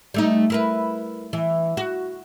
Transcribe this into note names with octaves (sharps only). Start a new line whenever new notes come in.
G3 A3 D#4
E4 A#4 B4
E3
F#4